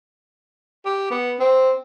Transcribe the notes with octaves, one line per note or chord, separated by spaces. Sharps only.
G4
B3
C4